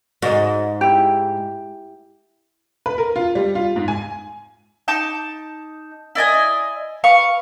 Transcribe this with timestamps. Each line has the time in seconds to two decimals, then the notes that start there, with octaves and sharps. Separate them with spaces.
0.22 G#2 F#4 D#5
0.81 E4 G4
2.86 B4
2.98 A#4
3.16 F4
3.35 G3
3.55 F4
3.76 G#2
3.88 G#5
4.88 D#4 A5 D6 G6
6.15 E4 D5 D#5 G#5
7.04 B4 F5 C#6